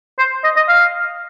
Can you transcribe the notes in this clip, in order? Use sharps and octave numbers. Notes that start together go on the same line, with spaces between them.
C5
D#5
D#5
F5